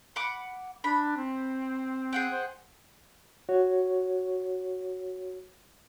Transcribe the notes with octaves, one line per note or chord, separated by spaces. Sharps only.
F#5 B5 D6
D4 B5
C4
G#4 F#5 G5
C5
F#4 C#5